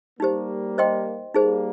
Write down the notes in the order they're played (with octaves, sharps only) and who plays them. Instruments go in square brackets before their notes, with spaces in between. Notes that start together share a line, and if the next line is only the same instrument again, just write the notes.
[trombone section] G3 A#3 [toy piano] D#4 G4 C5
[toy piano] C5 D#5 G5 C6
[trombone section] G3 A#3 [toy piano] D#4 G#4 C5